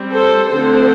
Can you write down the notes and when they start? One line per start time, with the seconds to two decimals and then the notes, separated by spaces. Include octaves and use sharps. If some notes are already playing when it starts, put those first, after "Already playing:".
Already playing: G3 C4
0.12 A4 C5
0.51 D3 F3 A3 C4 A4 C5